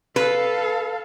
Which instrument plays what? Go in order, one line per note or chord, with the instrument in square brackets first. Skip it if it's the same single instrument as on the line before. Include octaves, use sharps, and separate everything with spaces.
[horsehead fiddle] A4 F5 [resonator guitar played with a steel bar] B4